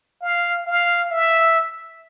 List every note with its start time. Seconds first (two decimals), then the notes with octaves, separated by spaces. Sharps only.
0.21 F5
0.66 F5
1.11 E5